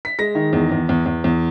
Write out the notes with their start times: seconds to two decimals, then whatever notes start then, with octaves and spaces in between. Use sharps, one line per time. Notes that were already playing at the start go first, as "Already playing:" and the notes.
0.05 B6
0.19 G#3 A#6
0.35 D#3
0.53 E2
0.72 E2
0.89 E2
1.06 E2
1.24 E2